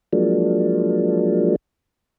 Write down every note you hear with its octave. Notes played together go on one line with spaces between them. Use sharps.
F3 F#3 G#3 A#3 D4